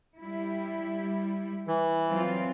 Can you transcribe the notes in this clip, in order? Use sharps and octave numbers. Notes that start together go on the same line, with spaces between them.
G3 E4
E3
F#3 C4 F4